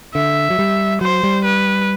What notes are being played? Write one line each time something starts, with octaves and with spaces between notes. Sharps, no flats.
D3 E5
F#3
G3
F#3 C5
G3
B4